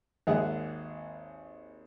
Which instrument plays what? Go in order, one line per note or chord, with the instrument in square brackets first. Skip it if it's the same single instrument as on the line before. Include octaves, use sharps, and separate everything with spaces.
[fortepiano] G#1 D#2 G#3 G#4 E5 F#5